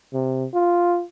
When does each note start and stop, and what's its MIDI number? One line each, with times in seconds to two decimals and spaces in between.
0.13 0.47 48
0.54 1.03 65